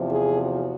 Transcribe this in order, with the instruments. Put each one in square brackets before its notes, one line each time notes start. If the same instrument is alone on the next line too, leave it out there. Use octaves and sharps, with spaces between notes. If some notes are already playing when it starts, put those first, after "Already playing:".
Already playing: [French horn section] E2 C3 F3
G#4
F#4